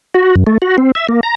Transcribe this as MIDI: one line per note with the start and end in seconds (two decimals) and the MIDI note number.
0.14 0.35 66
0.36 0.44 42
0.47 0.58 57
0.62 0.77 66
0.78 0.92 60
0.95 1.07 76
1.09 1.21 58
1.23 1.35 82